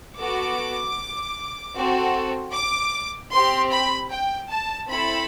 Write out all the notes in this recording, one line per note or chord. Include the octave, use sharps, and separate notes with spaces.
B3 F#4 A4 D6
C4 F#4 A4
D6
C4 G4 C6
B5
G5
A5
C4 E4 A4 B5